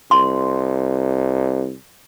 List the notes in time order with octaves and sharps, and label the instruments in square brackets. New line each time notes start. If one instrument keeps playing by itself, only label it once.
[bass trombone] C2 [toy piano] C6